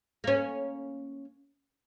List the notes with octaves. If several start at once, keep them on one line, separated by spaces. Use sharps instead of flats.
A#3 C#4